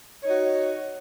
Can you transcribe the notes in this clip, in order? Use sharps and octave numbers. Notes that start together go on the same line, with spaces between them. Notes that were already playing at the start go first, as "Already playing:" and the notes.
D#4 F#4 C#5